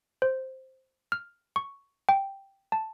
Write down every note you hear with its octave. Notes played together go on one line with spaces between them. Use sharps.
C5
F6
C#6
G5
A5